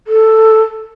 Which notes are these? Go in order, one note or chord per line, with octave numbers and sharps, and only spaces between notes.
A4